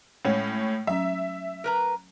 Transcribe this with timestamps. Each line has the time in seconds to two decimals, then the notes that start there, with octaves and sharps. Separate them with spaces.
0.25 A2 G#3 A3 C#4
0.87 F#3 C#4 E5
1.64 A#4 B4 A#5